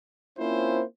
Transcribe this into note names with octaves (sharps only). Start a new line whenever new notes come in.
A#3 C4 C#4 E4 F4 C5